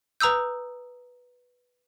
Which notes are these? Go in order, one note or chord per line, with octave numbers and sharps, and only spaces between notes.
B4 A#5 D#6 E6 G6